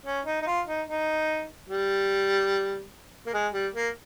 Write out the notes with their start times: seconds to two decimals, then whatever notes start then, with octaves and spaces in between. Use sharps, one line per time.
0.06 C#4
0.26 D#4
0.41 D#4
0.47 F4
0.67 D#4
0.88 D#4
1.69 G3
3.26 A#3
3.33 G#3
3.53 G3
3.74 A#3